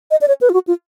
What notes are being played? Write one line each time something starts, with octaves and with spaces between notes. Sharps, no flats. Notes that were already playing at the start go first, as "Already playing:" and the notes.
D#5
D5
C#5
B4
F4
F#4
F4